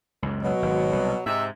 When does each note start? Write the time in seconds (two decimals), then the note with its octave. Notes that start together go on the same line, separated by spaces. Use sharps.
0.22 C#2 F#2
0.42 B2 F#3
0.62 G#1
0.93 C2
1.26 G#2 C3 D#4 E5